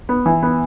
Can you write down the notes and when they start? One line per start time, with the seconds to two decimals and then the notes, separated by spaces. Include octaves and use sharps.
0.09 B3
0.26 E3
0.43 B3